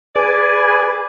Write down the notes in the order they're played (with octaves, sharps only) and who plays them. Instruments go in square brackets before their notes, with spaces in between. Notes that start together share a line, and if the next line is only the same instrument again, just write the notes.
[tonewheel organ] G#4 B4 G#5 [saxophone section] D5